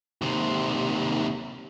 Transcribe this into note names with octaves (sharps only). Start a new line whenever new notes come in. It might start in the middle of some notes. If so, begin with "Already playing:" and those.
D#2 C3